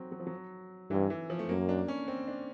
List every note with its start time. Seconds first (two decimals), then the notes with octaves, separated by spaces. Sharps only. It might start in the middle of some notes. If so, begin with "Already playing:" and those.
Already playing: F#3 C4
0.12 F#3
0.20 F3
0.27 F#3
0.90 G2 E3
1.10 E3
1.30 F3
1.39 A3
1.49 F#2 A#3
1.69 D4
1.88 C#4
2.08 C4
2.28 D4